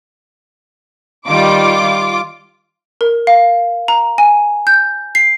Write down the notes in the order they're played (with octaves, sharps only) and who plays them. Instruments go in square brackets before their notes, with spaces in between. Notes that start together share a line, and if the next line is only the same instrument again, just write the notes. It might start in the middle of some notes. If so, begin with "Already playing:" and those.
[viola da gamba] D#3 G3 [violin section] F4 D6
[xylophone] A#4
F5
A#5
G#5
G6
C7